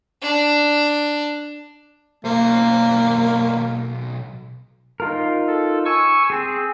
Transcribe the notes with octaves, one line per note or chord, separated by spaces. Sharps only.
D4
B1 A#3 C5
D#4 F4 A#4
A4
G#5 C#6 E6
C4 G#4